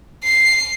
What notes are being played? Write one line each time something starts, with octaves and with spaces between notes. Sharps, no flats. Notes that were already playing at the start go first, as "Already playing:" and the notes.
C7